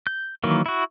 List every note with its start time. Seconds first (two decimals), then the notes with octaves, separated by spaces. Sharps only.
0.07 G6
0.44 D#3 E3 F#3 A#3
0.66 E4 F#4